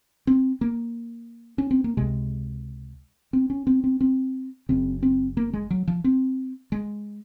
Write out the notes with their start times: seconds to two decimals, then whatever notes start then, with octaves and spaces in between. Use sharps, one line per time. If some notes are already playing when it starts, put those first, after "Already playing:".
0.27 C4
0.61 A#3
1.58 C#4
1.71 C4
1.84 A#3
1.97 C#2 C3 G#3
3.33 C4
3.50 C#4
3.67 C4
3.84 C4
4.01 C4
4.69 F#1 F#2 C#3 C4
5.03 C4
5.37 A#3
5.53 G#3
5.70 F#3
5.88 F3
6.04 C4
6.72 G#3